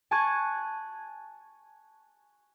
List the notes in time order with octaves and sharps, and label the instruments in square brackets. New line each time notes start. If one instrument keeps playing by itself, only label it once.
[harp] G#5 A5 C#6 F#6 G#6 D#7